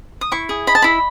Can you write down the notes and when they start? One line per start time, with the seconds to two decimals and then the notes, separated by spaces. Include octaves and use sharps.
0.21 D#6
0.32 E4 C#6
0.49 G#4
0.67 D#5 B5
0.75 A5
0.82 E4 B5